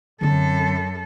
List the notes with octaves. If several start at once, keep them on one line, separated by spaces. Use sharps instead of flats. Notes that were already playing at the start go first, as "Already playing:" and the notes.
F#2 D3 C4 A4